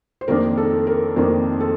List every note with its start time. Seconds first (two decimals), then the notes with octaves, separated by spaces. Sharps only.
0.21 C5
0.28 F2 D#3 A#3 D4 A#4
0.58 A4
0.87 A#4
1.16 F2 D#3 A#3 D4 C5
1.60 A4